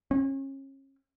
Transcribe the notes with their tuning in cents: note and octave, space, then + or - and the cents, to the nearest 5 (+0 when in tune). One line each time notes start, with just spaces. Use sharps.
C#4 -35